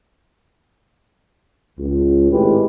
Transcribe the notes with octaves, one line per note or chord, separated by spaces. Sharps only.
C#2
G#1 A2 G#3 G4 B4